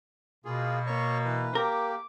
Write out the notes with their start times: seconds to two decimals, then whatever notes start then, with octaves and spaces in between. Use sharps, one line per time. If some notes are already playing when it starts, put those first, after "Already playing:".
0.45 B2 A#3 F4 G#4
0.87 A#3 C#5 C#6
1.25 E3 B4
1.55 A#3 G4 A#4 D6